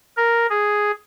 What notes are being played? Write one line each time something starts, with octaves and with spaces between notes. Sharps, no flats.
A#4
G#4